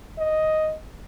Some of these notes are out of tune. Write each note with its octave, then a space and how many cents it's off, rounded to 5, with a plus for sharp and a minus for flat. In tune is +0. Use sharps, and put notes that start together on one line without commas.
D#5 +5